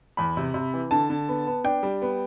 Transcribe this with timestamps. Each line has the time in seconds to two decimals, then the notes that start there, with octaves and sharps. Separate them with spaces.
0.17 E2 B5
0.37 C3
0.54 C3
0.74 E3
0.91 D3 A5
1.10 D3
1.29 B3
1.46 B3
1.64 D4 G5
1.83 G3
2.02 B3